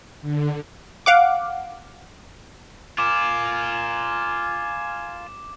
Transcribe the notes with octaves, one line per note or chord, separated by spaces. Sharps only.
D3
F5 F#5 D6
F4 A#4 G#5 D6 E7